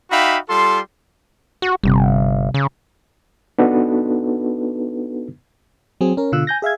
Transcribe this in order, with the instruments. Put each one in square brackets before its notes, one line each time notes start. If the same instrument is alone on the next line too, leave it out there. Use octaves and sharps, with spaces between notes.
[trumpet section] D#4 F#4 E5 F5 G5 B5
G3 F4 A4 C6
[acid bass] F#4
[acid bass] G1 [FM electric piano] C3 G3
[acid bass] C#3
[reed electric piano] B3 D4 D#4 F#4 A4 B4
[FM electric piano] F#3 C4 G#4
C#4 A#4
B2 D3 F4 E6 F#6
G#5 G6 A#6
G#4 E5 F5 G#6